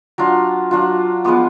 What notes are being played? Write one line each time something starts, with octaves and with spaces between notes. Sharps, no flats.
F#3 D4 F4
F#3 D4 F4
F3 G#3 B3 F4 D6